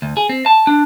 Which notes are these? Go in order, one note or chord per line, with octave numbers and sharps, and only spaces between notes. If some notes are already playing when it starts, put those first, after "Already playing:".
D2
G#4
C4
A5
D4